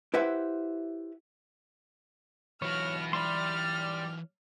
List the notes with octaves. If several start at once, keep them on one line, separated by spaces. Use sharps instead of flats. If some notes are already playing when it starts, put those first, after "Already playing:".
E4 G4 B4 C5 E5 F#5
E3 F#3 B3 F#4 C#5 F6
G3 D5 B5 C6 F6